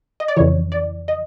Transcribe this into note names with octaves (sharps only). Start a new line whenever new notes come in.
D#5
D5
F2 C#3 E3 C#5
D5
D#5